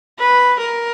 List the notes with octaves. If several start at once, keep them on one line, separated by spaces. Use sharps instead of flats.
B4
A#4